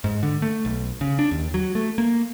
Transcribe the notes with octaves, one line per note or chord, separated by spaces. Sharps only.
G#2
D3
A3
B1
C#3
D4
D#2
F#3
A3
A#3